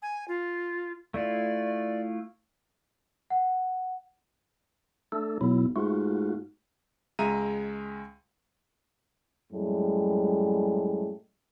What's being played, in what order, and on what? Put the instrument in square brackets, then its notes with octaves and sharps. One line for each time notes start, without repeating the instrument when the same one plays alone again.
[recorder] G#5
F4
[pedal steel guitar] A3 E4 F4 [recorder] D5
[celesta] F#5
[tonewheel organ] A3 D4 A4
[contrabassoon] B1 [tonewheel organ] B2 F#3 E4
[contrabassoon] G#2 [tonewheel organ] A3 F4 F#4
[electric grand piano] C#2 G#3 E5 A#5 D#7
[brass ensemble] F#2 A2 G3 G#3